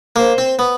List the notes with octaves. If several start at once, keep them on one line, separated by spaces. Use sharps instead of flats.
A#3 C5
C4
B3